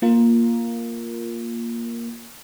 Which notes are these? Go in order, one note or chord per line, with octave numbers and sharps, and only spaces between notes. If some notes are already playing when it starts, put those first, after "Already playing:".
A#3 F4 A#4